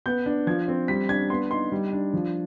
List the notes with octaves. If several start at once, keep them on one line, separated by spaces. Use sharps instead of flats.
B3 G6
D4
F3 G#6
C4
G3 B6
D4 G#6
B3 C6
D#4 C6
G3
D4
F3